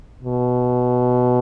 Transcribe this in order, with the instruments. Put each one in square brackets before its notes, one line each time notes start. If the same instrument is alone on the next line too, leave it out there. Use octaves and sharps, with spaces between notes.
[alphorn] B2